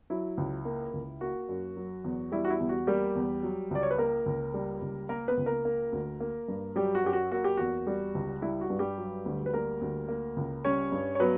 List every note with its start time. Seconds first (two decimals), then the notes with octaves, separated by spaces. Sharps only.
0.10 F#3 E4
0.37 C#2
0.65 A#3
0.94 C#2
1.21 A#3 F#4
1.49 F#2
1.77 F#3
2.04 E2
2.32 G3 E4
2.45 F#4
2.50 E4
2.60 E2
2.69 F#4
2.87 G3 A#3 G4
3.15 E2
3.43 F#3
3.71 C#2 D5
3.83 C#5
3.91 B4
3.98 A#3 A#4
4.26 C#2
4.54 G3
4.82 C#2
5.09 A#3 A#4
5.28 B3 B4
5.37 C#2
5.46 A#3 A#4
5.65 A#3
5.92 D2
6.20 A#3
6.48 G2
6.76 F#3 G3 G4
6.95 F#4
7.04 F#2 G4
7.13 F#4
7.32 A#3 F#4
7.44 G4
7.57 E2 F#4
7.87 G3
8.15 C#2
8.42 G3 E4
8.61 F#4
8.70 G2
8.79 G3 G4
8.98 F#3
9.25 D2
9.46 B4
9.53 G3 A#3 A#4
9.81 D2
10.08 A#3
10.37 C#2
10.65 G3 C#4 C#5
10.92 G2
11.15 C#5
11.20 F#3 B3 B4